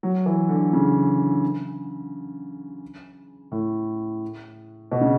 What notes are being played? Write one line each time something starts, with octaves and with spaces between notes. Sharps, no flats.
F#3
E3
D3
C#3
A2
B2
C#3